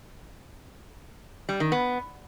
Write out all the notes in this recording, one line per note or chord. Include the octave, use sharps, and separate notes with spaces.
G3
D#3
B3